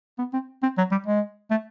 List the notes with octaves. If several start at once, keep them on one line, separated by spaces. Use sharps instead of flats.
B3
C4
C4
F#3
G3
G#3
A3